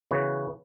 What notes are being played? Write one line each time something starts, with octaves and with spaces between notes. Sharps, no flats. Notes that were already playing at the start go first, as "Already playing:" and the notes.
C#3 E3 B3 F#4 B4